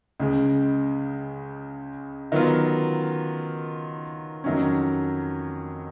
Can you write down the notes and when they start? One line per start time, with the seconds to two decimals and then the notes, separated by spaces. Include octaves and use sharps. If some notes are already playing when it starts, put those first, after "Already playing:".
0.20 C#2 C#3 G#3
2.32 D#3 F#3 B3 F4
4.44 F2 D#3 F#3 C#4